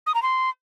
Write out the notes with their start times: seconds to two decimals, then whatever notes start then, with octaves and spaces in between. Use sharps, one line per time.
0.07 D#6
0.15 A#5
0.22 C6